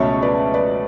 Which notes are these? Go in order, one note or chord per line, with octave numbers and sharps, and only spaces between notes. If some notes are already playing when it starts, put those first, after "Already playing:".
Already playing: C#2 B2 A3 C#4 C#5 E5 A5 C#6
B4 D5
B4 D5